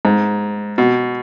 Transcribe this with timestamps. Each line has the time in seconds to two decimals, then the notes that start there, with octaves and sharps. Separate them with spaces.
0.05 G#2
0.78 B2